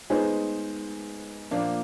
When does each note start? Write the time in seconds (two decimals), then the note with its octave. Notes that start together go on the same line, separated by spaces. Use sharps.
0.10 G#3 B3 D#4 G#4 C5
1.51 A#2 F3 A#3 D4 F4